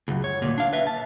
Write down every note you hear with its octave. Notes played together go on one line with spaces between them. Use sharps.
C#2 F#2
C#5
D2 A#2
D4 F5
B4 E5
A5